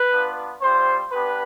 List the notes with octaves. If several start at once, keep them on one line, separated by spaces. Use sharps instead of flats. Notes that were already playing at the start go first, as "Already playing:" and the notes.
Already playing: B4
B3 D4 F4
G3 C4 F4 C5
B3 D4 G4 B4